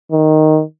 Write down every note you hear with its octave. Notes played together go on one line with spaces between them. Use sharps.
D#3